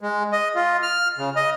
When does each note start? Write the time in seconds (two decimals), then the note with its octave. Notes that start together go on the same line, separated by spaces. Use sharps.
0.01 G#3
0.33 D#5
0.55 F4
0.83 F6
1.18 C#3
1.36 D#5